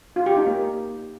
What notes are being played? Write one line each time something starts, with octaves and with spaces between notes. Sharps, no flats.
F4
G4
D#4
A#3